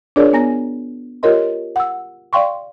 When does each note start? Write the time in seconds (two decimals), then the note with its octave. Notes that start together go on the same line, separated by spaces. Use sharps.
0.16 D4 F4 G#4 A#4 C#5 D5
0.33 B3 G#5 A#5 A#6
1.23 F4 G4 A#4 C#5 D#5 C6
1.76 F#5 E6
2.33 D5 F5 G5 C6 C#6